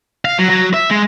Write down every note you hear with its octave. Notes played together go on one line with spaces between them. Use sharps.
F5
F#3
F#3
E5
G#3